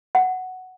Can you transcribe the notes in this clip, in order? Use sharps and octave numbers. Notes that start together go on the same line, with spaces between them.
F#5